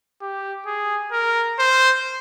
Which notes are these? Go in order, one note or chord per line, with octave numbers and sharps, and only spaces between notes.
G4
G#4
A#4
C5